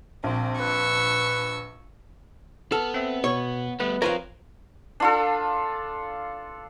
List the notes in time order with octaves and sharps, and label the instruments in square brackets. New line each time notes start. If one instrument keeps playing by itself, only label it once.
[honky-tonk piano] A#1 [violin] C4
[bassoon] B4 [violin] C#6 E6
[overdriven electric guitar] B3 [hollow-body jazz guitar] A4 [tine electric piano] F6
[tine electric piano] C4 E5
[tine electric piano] B2 [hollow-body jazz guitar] C#5
[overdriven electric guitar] G3 A3 [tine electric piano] B3 B4
[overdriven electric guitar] F3 C4 [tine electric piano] F4 C#5 [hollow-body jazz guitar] A#4 B4 F5
[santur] D4 F4 A4